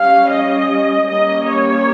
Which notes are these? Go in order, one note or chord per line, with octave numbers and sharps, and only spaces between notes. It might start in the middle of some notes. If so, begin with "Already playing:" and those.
Already playing: G3 C#4 F5
D#5
G3 A#3 C#4 D#5
C#5